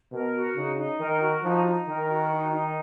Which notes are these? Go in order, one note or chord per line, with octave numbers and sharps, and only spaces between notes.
B2 A#4
F#4
C#3 D#4
D#4
D#3 A#4
F#4
F3 D#4
D#4
D#3 A#4
F#4
D#4
D#4